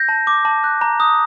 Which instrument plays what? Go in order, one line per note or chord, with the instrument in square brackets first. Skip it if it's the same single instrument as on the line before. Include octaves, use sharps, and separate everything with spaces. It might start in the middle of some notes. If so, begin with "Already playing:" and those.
Already playing: [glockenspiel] G6 A#6
A5
D6
A5
F#6
A#5
D#6